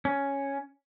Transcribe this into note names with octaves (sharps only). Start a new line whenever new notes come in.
C#4